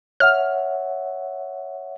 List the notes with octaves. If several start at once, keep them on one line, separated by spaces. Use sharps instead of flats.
C#5 E5 F#5 F6